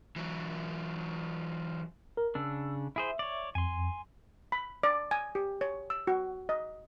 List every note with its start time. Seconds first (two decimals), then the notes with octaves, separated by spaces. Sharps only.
0.16 E3 F#3
2.17 A#4
2.35 C#3 D4 E6
2.96 E4 G#4 C5 E5
3.19 C#5 D5
3.55 F2 G#5 C6
4.52 B5
4.83 D5
5.11 G#5
5.35 G4
5.61 C#5
5.90 E6
6.07 F#4
6.49 D#5